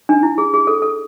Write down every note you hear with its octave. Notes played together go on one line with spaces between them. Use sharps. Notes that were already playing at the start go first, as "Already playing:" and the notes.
D4
E4
G#4
G#4
A4
A4